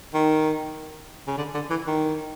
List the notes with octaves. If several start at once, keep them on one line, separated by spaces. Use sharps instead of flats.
D#3
C#3
D3
D3
E3
D#3